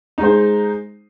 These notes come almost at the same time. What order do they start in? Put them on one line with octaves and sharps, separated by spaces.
D#4 G#3 C5